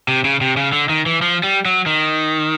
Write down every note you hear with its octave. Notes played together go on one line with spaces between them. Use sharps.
C3
C#3
C3
C#3
D3
D#3
E3
F3
G3
F#3
D#3